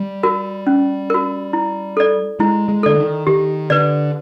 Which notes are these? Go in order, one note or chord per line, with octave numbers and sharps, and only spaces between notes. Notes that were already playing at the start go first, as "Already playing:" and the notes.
Already playing: G3
F#4 A#4
C#4
F#4 A#4
E4
A4 D5
G#3 E4
G#3
D3 A4 D5
D#3
D#3 G4
D3 B4 D5